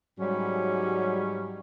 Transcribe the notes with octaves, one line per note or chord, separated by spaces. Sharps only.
G#2 F#3 G3 C#4